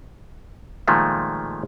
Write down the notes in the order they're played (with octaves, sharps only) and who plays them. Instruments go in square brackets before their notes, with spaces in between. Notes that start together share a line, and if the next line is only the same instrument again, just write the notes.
[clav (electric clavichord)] A#2 D#3 F3 G#3 A3